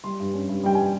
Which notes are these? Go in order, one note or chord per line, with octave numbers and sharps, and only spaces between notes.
G3 C6
G2
C#4
G2
G3 G5
G#5